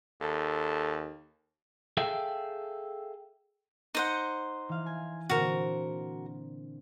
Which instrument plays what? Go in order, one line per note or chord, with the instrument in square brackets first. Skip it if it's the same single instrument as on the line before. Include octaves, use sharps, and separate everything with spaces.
[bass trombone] D#2 [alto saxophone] A4
[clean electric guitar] G#4 A4 E5 F5 G5
[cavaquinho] D#4 C5 F#5
[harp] E3 F5
G#5
[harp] A#2 D3 C4 [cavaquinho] F#4 A#4